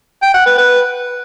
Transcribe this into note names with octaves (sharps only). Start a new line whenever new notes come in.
G5
F#5
B4
B4